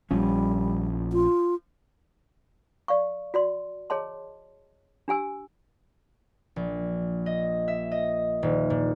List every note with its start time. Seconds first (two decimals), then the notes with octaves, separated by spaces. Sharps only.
0.11 A#1 F3 G3 C#4
1.13 F4
2.88 D5 F5 C#6
3.34 F#4 D5 C6
3.90 G#4 C#5 D#5 A5 C6
5.08 D4 G4 G#5 E6
6.56 A#1
7.26 D#5
7.68 E5
7.91 D#5
8.43 D#1
8.70 A#2